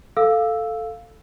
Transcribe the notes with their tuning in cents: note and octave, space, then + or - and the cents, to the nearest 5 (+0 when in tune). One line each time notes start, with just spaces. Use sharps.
A4 +0 F5 +0 E6 +0